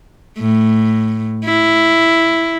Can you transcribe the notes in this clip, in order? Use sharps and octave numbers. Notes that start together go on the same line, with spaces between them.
A2
E4